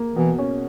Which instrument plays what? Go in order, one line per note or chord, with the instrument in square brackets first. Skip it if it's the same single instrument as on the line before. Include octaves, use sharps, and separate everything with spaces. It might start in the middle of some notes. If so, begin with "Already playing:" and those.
Already playing: [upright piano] A#3
[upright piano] B2 [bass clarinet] E3
[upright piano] C#4